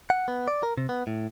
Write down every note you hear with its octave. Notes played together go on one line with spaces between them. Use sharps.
F#5
B3
D5
A#4
C3
B3
A2